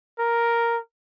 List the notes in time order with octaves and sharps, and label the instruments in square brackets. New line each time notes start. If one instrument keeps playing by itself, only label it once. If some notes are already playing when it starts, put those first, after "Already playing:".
[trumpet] A#4